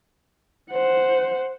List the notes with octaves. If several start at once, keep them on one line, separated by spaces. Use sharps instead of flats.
C5 F#5